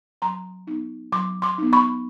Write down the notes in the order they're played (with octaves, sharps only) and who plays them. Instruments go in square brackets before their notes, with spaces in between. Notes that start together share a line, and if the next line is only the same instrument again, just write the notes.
[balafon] F#3 A#5 C6
B3 D#4
F#3 C6 D6
C6 D6
B3 D#4
B5 C#6